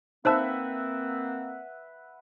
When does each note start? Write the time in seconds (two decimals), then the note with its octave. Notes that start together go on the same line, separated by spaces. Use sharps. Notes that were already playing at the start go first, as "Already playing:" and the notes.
0.25 A#3 C4 D#4 B4 C5 E5 F#5 A5